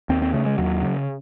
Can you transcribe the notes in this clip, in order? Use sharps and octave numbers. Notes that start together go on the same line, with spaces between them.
D#2 C4
C4
C#3 A3
G#3
D#2 F#3
C#3